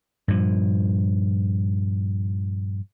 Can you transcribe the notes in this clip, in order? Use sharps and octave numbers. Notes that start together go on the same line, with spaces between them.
G2 A#2 F3